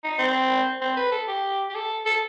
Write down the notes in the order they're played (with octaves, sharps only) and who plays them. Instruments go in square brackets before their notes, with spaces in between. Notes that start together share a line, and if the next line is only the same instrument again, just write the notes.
[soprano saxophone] D#4
C4
C4
B4
A4
G4
G4
A4
A4